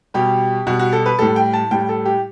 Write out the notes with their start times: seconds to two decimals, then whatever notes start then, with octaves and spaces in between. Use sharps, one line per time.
0.14 B2 G3 G4
0.67 B2 G3 F#4
0.79 F#4
0.93 A4
1.06 B4
1.19 A2 G3 A4
1.36 G5
1.53 A5
1.71 A2 G3 G5
1.89 A4
2.05 G4